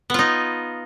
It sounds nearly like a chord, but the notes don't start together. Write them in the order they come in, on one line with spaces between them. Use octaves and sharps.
B3 F4 D#4